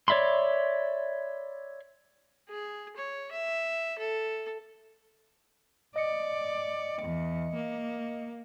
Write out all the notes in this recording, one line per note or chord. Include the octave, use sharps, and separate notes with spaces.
C#5 D5 E5 B5 C6
G#4
C#5
E5
A4
D5 D#5 C#7
E2
A#3